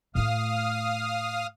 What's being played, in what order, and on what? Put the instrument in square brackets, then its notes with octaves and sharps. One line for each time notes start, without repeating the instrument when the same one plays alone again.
[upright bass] A2 A3 [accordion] F5 D#6 F6